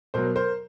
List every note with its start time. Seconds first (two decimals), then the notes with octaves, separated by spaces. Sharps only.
0.14 B2 F#3 A#4 C5
0.35 A#4 C5